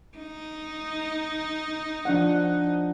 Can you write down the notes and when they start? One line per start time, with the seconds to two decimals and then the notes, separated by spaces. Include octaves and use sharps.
0.18 D#4
2.05 F3 D4 F#5